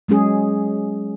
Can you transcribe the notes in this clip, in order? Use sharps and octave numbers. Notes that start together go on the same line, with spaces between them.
F#3 G#3 C#4 G#4